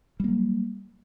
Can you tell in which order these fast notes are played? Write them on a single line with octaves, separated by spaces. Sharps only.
G3 A#3 F#3